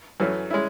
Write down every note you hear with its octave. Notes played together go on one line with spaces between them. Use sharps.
F#2 E3 A3 C#4
G#3 C#4 E4